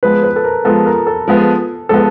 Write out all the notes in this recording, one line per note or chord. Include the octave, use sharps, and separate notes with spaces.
F3 G#3 B3 B4
B4
A4
A#4
F3 G#3 B3 A4
A#4
A4
F3 G#3 B3
F3 G#3 B3 A4